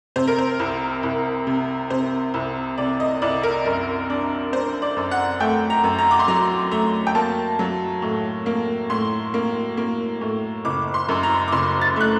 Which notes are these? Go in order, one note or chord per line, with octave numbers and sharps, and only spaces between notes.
C3 C5
A#4
C5
C2
C2
C3
C3 C5
C2
C3 D5
D#5
C2 D5
A#4
F#2 A#4
D4
D4 C5
D5
F#2
F#5
A3 G5
A#5
F#2
A#5
D6
C6
F#3 A#5
A3 A#5
G5
A#3 A5
F#3
A2
A#3
A2 C6
A#3
A#3
A2
F#1 D6
C6
F#2
A#5
D6
F#1 C6
A6
A3 F#6